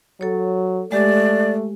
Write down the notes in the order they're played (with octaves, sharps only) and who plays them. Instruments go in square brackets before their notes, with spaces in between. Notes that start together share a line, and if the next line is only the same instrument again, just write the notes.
[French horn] F#3 [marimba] A4 C#5
[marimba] G#3 G4 [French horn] A3 [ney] D5